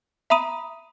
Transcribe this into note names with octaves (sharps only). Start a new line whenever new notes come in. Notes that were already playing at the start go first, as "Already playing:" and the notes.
E5 A#5 B5 D#6 D#7